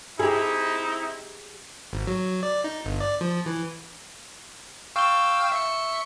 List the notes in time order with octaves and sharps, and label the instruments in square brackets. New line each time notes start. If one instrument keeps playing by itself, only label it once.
[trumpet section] C4 D#4 E4 [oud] G4 G#4
[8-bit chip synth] G#1
F#3
D5
D#4
G1
D5
F3
E3
[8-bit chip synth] F5 G5 E6 [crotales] C#6 G7
[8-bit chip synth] E5 C#7